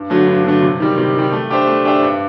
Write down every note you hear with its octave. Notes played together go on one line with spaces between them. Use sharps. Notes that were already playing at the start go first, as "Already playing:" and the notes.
Already playing: G2
D3 F#3 A3
G2
D3 F#3 A3
C3
D#3 G3
C3
D#3 G3
A3
D4 G4 C5 E5
A3
D4 G4 C5 E5
G2